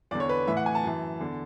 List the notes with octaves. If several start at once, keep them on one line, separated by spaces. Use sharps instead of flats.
E2 D3 D5
C#5
B4
A2 E3 E5
F#5
G#5
A5
F#2 E3
E2 D3